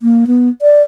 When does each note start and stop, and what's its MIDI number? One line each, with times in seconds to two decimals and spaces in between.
0.02 0.25 58
0.27 0.49 59
0.62 0.83 74